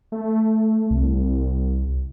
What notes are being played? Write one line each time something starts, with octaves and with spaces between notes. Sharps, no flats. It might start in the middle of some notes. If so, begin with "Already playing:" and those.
A3
C2